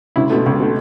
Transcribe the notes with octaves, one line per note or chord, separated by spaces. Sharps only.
C#2 E4
B2 A3
C#2
B2 A3